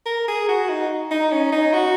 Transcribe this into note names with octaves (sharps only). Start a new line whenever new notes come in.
A#4
G#4
F#4
D#4
D#4
C#4
D#4
F#4